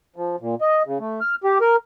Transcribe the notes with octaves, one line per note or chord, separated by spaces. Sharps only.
F3
A#2
D#5
C#3
A3
F6
G4
A#4